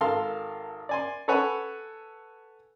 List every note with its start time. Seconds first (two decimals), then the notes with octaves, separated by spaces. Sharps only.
0.01 G#1 A4 A#4 F5 C6
0.89 D5 G#5 C6
1.28 A4 B4 C#5 F#5 G#5 B5